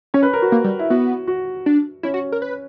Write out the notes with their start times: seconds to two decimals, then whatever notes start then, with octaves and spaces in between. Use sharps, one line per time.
0.14 C#4 C#5
0.23 B4
0.33 A#4
0.42 F#4
0.52 A#3
0.64 G3
0.79 E4
0.90 B3 F#4
1.27 F#4
1.66 D4
2.03 C#4 E4
2.14 F#4
2.32 A#4
2.42 B4